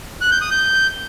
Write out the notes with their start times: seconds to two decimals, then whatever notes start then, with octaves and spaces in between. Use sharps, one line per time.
0.21 F#6
0.31 G6
0.41 D#6
0.51 G6